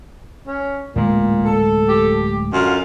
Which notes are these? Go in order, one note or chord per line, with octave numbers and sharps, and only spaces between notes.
C#4
D1 A#2 G#3
A4
G4
F#2 D3 F4 F5